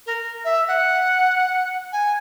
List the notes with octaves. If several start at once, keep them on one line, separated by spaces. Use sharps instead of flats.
A#4
E5
F#5
G#5